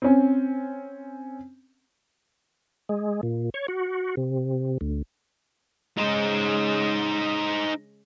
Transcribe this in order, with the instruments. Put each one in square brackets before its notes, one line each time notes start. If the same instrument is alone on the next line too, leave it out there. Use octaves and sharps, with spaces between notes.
[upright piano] C4 C#4
[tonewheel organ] G#3
A#2
C#5
F#4
C3
D2
[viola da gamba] C#3 G#3 [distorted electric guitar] D#4 C5